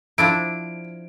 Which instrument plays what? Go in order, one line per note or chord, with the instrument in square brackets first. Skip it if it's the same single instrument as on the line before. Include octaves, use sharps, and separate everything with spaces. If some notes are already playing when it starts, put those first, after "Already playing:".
[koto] F3 D4 E4 [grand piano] D7